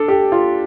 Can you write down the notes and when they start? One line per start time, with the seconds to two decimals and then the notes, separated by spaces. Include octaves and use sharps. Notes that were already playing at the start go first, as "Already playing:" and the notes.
Already playing: D4 A4
0.08 G4
0.32 F4